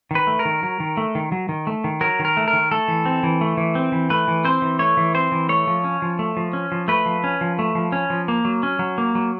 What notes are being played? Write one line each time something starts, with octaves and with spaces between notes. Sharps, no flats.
D#3 B4
A3
A#4
D#3
F#3
D#3
A3
D#3
F#3
D#3
A3
D#3
F#3 A#4
D#3
A#4
A3
A#4
D#3
A3 A4
E3
C4
E3
A3
E3
C4
E3
A3 B4
E3
C4 C5
E3
A3 C#5
E3
C4 C5
E3
A3 C#5
F3
C#4
F3
A3
F3
C#4
F3
A3 B4
F3
C#4
F3
A3
F3
C#4
F3
A#3
F#3
C#4
F#3
A#3
F#3